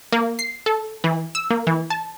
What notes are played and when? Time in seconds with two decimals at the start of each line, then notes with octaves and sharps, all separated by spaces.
0.12 A#3
0.39 C7
0.66 A4
1.04 E3
1.35 E6
1.50 A#3
1.67 E3
1.90 A5